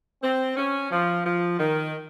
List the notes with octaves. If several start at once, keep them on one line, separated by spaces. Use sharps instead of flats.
C4
C#4
F3
F3
D#3